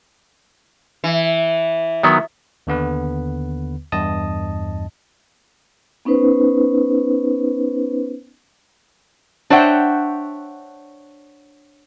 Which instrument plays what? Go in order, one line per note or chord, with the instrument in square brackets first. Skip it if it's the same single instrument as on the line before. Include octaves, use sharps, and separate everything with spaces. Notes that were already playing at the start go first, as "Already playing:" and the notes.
[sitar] E3
[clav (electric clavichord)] D#3 F#3 B3
[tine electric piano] D#2 D3 B3 B4
E2 G2 D#5 A5 D#6
[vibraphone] B3 C#4 D#4 B4 C5
[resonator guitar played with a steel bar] D4 C5 C#5 E5 F#5 G5